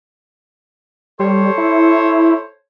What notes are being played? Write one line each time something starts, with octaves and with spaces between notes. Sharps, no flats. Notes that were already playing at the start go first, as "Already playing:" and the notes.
G3 A4 C5 C#5
E4